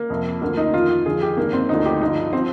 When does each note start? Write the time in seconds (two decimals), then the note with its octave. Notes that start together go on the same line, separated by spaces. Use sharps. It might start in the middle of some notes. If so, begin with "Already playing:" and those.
Already playing: A#3
0.10 F2 C3 F3
0.41 D2 D3 F3 A#3
0.57 D#4
0.73 F2 D#3 F4
1.06 F2 D3 F3 G#4
1.22 G4
1.37 G2 D#3 A#3
1.53 C4
1.69 D2 D3 F3 D#4
1.85 G4
2.01 G2 D3 F3 D#4
2.33 F3 C4